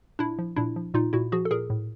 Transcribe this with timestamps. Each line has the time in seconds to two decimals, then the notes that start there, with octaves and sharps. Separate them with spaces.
0.19 A#2 D4 E4
0.39 F3
0.56 A#2 D4 E4
0.76 F3
0.94 A#2 D#4 F4
1.13 A#2 E4 F#4
1.32 F3 F#4 G#4
1.45 A4
1.51 A#2 G#4 A#4
1.70 A2